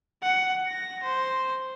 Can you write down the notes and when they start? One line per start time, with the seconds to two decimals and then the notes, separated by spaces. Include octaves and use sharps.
0.23 F#5
0.68 A#6
1.03 C5